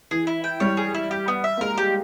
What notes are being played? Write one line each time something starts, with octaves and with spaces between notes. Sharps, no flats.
E3 G#4
E4
G5
G3 C#5
G#4
E4
G4
B3
E5
A#3
G#3 A#4
G4